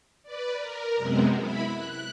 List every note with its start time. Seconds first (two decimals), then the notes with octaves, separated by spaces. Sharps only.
0.23 B4 D5
0.57 A#4
0.96 F#2 C3 G#3 B3 C4
1.39 E4 B5
1.72 F#6